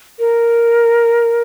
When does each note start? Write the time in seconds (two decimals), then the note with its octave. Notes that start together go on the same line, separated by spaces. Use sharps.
0.19 A#4